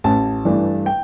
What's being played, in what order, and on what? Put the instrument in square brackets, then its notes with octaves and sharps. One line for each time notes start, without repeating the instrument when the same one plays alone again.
[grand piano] A1 A5
G2 E3 A3 D4
G5